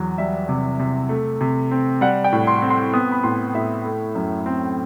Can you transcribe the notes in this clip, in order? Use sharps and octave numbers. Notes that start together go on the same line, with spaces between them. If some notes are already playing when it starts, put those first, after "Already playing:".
Already playing: E2 F#3
G3 E5
C3
C3
A3
C3
C4
G3 F#5
G5
A2
C6
C4
C6
B3 D#6
B5
A2 C6
A2 E5
A3
F#2
C4